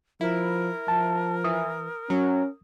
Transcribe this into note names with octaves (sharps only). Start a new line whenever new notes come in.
F3 E4 A#4
F3 A5
E3 D#6
F#3 C#4